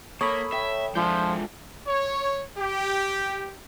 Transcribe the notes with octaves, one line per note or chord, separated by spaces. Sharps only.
A#3 A4 C#5 B5 D#6
E5 G5
F3 G#3 D4 E4 F4 A5 G6
C#5
G4